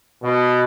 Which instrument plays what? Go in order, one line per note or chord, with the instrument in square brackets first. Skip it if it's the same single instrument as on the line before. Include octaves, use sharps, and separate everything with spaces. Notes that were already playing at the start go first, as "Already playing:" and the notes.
[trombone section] B2